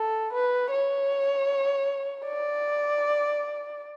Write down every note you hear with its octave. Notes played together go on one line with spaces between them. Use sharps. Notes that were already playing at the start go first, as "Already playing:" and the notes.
Already playing: A4
B4
C#5
D5